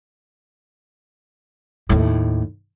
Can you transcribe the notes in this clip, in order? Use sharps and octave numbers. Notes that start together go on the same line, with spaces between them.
D#2 A2